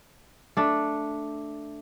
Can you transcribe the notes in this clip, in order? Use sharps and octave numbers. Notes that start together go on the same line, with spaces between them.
A3 D4